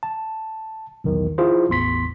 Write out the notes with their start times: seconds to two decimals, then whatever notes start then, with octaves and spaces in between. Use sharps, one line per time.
0.03 A5
1.04 B1 E2 D#3
1.38 E4 F4 G#4 C5
1.69 A1 E2 C6 B6